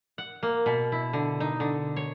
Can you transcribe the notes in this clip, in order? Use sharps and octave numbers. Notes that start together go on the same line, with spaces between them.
F#5
A#3
B2
E4
D3
D#4
D3
C#5